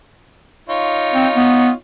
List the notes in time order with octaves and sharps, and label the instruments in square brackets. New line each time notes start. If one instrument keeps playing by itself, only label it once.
[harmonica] D#4 F4 C#5
[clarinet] C4
B3